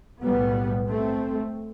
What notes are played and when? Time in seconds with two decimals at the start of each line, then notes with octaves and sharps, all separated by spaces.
0.22 B1 A2 G3 B3
0.88 A3 C4